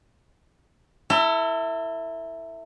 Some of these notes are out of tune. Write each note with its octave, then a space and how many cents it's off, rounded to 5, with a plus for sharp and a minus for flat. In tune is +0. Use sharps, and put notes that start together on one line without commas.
E4 +0 A4 +40